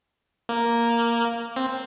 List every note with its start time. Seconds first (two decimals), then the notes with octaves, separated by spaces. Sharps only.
0.49 A#3
1.56 C4